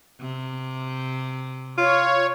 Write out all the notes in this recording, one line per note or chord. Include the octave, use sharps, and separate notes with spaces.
C3
F4 C#5